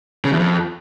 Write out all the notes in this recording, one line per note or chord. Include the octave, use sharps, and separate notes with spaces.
C#3
E2
F2